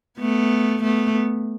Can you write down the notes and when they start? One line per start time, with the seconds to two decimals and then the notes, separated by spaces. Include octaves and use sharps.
0.19 A3 B3
0.83 A3 B3